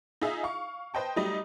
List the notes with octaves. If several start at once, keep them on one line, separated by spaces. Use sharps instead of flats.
D#4 F4 G#4 E5
F5 C#6
B4 C5 D#5 G5 A5
F#3 G3 A3 D#4 D#5